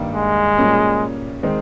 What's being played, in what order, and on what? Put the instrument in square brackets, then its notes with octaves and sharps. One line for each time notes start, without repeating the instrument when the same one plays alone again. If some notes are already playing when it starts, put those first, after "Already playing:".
Already playing: [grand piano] G2 D#3 G3 A#3
[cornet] G#3
[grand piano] A#2 G3 A#3 C#4 G#4
D#3 G#3 C4